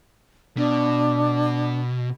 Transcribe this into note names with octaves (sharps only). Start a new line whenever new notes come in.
B2 D4